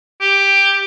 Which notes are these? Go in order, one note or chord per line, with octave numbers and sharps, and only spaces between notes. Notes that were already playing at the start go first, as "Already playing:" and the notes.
G4